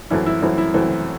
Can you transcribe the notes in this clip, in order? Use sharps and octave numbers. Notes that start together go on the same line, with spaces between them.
F#2 E3 A3 C4 E4
E4
F#2 E3 A3 C4 E4
E4
F#2 E3 A3 C4